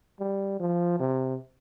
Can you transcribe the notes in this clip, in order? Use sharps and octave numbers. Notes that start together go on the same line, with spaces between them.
G3
F3
C3